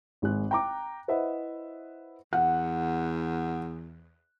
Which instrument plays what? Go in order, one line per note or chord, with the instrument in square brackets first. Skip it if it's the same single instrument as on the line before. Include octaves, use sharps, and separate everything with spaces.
[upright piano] G#1 G#3 F#6
G5 A#5 D6
E4 B4 C5 D#5 E5 F#5
[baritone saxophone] E2 [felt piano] F#5